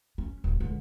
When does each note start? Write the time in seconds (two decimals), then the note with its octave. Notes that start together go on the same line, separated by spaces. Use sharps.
0.18 C#4
0.44 D1
0.60 C#2 D3